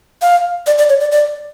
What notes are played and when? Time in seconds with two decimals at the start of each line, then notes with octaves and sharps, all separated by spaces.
0.22 F5
0.67 D5
0.78 D5
0.89 C#5
1.00 D5
1.12 D5